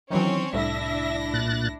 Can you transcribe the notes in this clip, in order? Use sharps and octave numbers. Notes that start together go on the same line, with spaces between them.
D#3 E3 F#3 C4 C#4 C#5
C2 A2 D4 E4 E5 A#6
A#2 F#6 A6